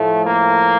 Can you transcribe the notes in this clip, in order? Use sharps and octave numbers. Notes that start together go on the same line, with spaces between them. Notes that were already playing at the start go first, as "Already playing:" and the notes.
Already playing: A2 F3 A3
A#3